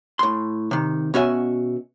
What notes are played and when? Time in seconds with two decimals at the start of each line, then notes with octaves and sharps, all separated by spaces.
0.19 A2 C6
0.71 C3 D#3
1.14 B2 C#4 F#4 E5 G#5